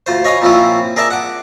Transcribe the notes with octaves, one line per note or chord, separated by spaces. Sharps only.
D2 F4 C5
C#5 D#5 F5 G#5 B5 D#6
A#2 F3 C4 C#4 E4 F4
G#4 A#4 D5 E5 A5
F#5 D6